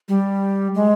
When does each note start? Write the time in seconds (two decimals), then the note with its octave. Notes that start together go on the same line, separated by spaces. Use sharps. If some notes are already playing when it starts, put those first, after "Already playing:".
0.08 G3
0.75 G#3